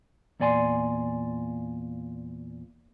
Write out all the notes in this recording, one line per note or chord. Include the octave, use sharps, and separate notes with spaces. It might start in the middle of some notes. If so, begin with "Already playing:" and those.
E2 A#2 D5 G#5 C6